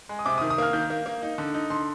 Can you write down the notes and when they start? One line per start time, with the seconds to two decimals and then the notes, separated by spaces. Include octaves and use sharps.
0.09 G#3
0.19 D#6
0.26 C3 D6
0.38 D#3 D#6
0.50 D#6
0.58 A#3 F6
0.73 D#3 G6
0.90 A#3
1.06 A#3
1.23 D#4
1.38 D3
1.54 D#4
1.70 D3 C6